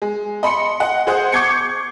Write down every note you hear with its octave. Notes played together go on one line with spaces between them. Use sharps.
G#3
D#5 B5 C6 C#7
D#5 F#5
G#4 C5 F#5 D#6
C#6 D6 G6 G#6 C7 C#7